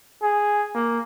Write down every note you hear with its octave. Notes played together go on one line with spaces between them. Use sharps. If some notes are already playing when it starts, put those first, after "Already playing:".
G#4
A#3